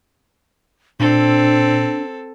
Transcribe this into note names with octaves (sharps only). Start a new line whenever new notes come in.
A#2 C4 D4 A4